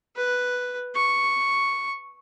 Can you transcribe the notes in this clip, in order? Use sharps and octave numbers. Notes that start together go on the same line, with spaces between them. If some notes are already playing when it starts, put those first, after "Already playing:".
B4
C#6